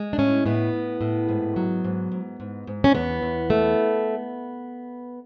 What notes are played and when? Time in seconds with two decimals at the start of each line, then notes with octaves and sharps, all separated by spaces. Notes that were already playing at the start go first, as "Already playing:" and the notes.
Already playing: G#3
0.13 D4
0.18 A2 C#4
0.46 A2 B3
0.73 A2
1.01 A2
1.29 G#2
1.56 F#3
1.84 G#2
2.12 G#2
2.40 G#2
2.67 G#2
2.84 C#4
2.95 E2 B3
3.23 E2
3.50 A3